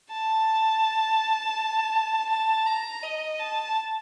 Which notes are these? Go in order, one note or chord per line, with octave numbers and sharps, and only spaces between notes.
A5
A5
A#5
D#5
A5